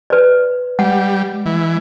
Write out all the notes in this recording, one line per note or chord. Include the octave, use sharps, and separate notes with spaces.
B4 D5
G3 G#3 F#5
E3 G#3